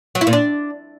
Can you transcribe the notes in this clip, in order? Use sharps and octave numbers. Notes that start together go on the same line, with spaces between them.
F#3
E4
A#2
D4